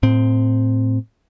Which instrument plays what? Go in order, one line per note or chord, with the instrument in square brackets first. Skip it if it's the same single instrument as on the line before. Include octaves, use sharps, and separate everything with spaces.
[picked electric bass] A2 C4